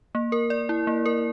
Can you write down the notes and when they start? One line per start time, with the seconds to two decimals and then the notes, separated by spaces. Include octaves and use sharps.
0.15 A#3
0.32 A#4
0.50 D5
0.69 E4
0.87 A#3
1.06 A#4